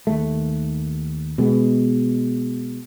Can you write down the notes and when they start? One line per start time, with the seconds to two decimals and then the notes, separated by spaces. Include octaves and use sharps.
0.07 D#2 A3
1.38 B2 G#3 B3